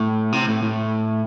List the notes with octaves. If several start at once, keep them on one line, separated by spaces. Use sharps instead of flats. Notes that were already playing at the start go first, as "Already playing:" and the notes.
Already playing: A2
C3
A2
A2